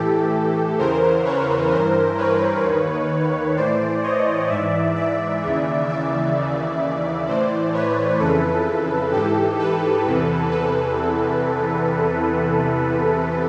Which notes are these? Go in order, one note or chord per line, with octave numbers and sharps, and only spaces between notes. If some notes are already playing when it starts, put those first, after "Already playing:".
Already playing: A2 E3 G4 A4
E2 C#3 E3 A#4 C5
B4 C#5
G2 E3 A#4 C5
B4 C#5
D#2 D#3
A2 E3 C5 D5
C#5 D#5
G#2 E3 D5 E5
D5 E5
D#2 C#3 E3
D5 E5
D#2 C#3 E3
A2 E3 C5 D5
B4 C#5
F2 C#3 E3 A4 B4
G#2 E3 G4 A4
A4 B4
E2 C3 E3
A4 B4